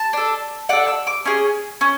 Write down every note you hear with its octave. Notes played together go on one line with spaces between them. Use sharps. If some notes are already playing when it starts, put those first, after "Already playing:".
Already playing: A5
D4 A4
D4 A4 F#5
E6
D6
C#4 G#4
C#4